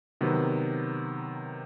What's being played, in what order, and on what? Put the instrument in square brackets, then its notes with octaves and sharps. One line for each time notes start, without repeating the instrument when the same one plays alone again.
[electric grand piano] C3 D#3 F#3 B3